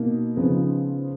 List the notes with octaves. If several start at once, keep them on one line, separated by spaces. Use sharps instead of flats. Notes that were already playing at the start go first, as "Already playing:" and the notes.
Already playing: B2 A#3 D#4
C#3 F3 B3 D#4